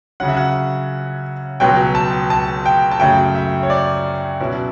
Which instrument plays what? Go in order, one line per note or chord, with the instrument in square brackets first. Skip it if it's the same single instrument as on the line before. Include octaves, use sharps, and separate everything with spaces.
[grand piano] C#3 F#3 C#4 F#5
E5
F#5
C#2 B2 F#3 G5
A5
A5
G5
A5
F#2 C#3 F#3 A3 G5
E5
C#5
D5
B2 F#3 C#4 E4